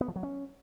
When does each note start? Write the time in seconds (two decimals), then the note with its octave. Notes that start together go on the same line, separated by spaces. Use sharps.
0.01 B3
0.08 F3
0.16 F#3
0.23 C#4